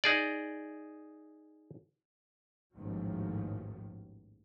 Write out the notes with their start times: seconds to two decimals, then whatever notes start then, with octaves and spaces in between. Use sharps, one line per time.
0.04 D#4 G#4 D5
2.73 A1 D#2 G#2 D#3 F3 F#3